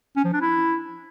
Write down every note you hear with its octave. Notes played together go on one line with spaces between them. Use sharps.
C#4
F3
D4
E4